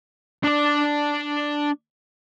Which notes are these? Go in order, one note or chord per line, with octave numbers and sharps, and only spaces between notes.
D4 D5